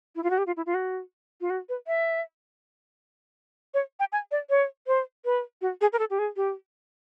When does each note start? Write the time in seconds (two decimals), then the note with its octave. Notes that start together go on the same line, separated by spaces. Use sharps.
0.16 E4
0.23 F4
0.30 F#4
0.38 G4
0.47 F4
0.57 E4
0.66 F4
0.74 F#4
1.41 F4
1.50 F#4
1.69 B4
1.87 E5
3.74 C#5
4.00 G5
4.12 G#5
4.31 D5
4.50 C#5
4.87 C5
5.25 B4
5.61 F#4
5.81 G#4
5.93 A#4
5.99 A4
6.10 G4
6.19 G#4
6.36 G4